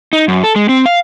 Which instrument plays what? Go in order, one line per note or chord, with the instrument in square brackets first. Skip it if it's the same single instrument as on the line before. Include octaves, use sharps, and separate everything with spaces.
[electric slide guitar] D#4
F#2
A4
G#3
C4
F5